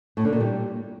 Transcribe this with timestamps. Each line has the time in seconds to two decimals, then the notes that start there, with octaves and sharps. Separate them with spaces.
0.17 A2
0.25 D3
0.33 A#2
0.40 G3